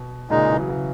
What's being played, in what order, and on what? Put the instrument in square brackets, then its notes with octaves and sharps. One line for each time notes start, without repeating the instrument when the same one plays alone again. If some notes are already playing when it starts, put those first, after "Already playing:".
Already playing: [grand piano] B2
[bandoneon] A#2 G#3 D#4 [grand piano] C#3
[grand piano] E3
F#3
C#3 E3